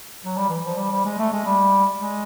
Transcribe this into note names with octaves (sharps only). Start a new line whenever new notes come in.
F#3
G3
E3
F3
G3
G3
G#3
A3
G#3
G3
G#3